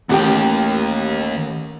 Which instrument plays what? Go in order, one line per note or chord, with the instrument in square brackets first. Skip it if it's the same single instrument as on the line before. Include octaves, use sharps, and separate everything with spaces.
[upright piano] A1 G4 G5 [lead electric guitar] D#2